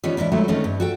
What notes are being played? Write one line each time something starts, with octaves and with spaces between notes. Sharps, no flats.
D#3 E3 G3 B3 C#4 F4
G#2 E3 C#4 D4 E4
D#3 F#3 G#3 A3 E4 F#4
D#3 A3 A#3 C4 C#4
G2
F#4 A4 G5